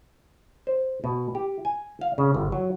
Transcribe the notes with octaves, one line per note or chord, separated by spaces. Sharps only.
C5
B2
G4
G#5
F5
C#3
G1
F#3